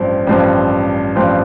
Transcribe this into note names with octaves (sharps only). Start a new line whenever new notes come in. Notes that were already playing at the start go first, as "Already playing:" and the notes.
Already playing: A1 G2 F3 C4
A1 G2 F3 C4
A1 G2 F3 C4